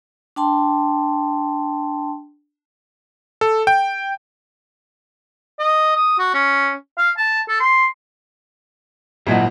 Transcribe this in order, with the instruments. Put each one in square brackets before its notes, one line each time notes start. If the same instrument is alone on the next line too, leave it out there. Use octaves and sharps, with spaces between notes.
[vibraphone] D4 G5 A5 C6
[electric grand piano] A4
G5
[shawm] D#5
D#6
F#4
C#4
F5
A5
A4
C6
[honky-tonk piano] G#1 A#2 D#5 [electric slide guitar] F#3 E4 F#4